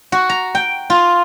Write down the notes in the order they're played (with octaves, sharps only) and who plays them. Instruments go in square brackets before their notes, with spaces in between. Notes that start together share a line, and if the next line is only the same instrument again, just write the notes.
[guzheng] F#4
A#5
G5
F4